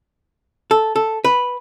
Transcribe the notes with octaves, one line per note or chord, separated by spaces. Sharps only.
A4
A4
B4